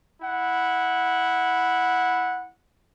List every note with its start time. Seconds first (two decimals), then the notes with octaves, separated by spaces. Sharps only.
0.21 E4 F#5